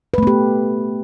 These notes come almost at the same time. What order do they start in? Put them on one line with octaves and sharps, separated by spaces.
B4 A3 B3 G4